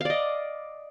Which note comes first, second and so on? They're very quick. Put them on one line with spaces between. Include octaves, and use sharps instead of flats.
F5 D5 D#5